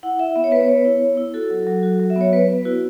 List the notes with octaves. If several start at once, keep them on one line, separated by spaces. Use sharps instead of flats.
E4 F#5
E4 E5
B3 E5
C#5
B3 B4
C#5
B3
E4
B3
E4
F#4 A4
F#3
F#3
F#4
F#3
E5
B3 C#5
B3 B4
B3
E4 F#4